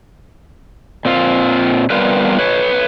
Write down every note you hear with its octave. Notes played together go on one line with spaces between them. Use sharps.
A#2 C4 F4
G3 B3 C4 F4 A#4 B4
B4 C#5